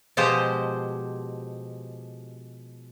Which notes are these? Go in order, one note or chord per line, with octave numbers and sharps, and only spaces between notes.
B2 F3 G#3 G4 C5 D#5